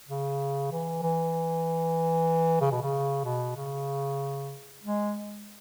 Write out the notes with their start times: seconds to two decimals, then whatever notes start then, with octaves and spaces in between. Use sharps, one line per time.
0.08 C#3
0.71 E3
1.02 E3
2.61 C#3
2.71 B2
2.81 C#3
3.24 B2
3.56 C#3
4.83 G#3